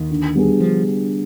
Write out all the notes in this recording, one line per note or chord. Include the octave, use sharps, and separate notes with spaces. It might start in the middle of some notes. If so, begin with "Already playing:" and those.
Already playing: D#2 D#3
D3
G3 B3 D4 G#4
D3 F3